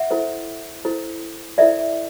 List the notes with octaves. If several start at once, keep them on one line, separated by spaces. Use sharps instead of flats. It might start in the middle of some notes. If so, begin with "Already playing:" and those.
Already playing: E5 F#5
E4 A4 C5
E4 A4 C5
E4 A4 C5 D5 E5